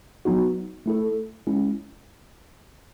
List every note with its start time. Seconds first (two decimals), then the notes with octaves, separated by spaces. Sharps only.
0.25 F#3 B3 D#4 F#4
0.86 A3 E4 A4
1.47 G#3 C#4 E4